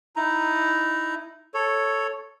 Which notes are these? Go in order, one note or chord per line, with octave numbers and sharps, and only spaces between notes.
D#4 E4 A#5
A4 C#5